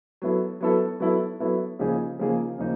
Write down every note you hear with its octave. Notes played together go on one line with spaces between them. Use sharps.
F#3 B3 E4 A4
F#3 B3 E4 A4
F#3 B3 E4 A4
F#3 B3 E4 A4
C#3 F3 A#3 D#4 G#4
C#3 F3 A#3 D#4 G#4
C#3 F3 A#3 D#4